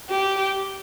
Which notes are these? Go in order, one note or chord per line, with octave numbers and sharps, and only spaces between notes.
G4